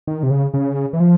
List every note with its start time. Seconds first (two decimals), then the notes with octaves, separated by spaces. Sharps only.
0.07 D#3
0.23 C3
0.31 C#3
0.54 C#3
0.93 E3
1.00 F3